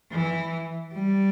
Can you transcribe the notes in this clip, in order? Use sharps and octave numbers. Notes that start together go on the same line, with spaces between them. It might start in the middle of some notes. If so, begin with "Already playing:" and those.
E3
G3